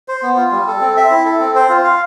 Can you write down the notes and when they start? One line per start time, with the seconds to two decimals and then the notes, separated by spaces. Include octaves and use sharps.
0.08 C5
0.23 B3
0.37 F4
0.52 G3
0.68 A4
0.81 C4
0.97 E5
1.11 E4
1.25 A4
1.40 C4
1.55 C5
1.69 F4
1.84 F5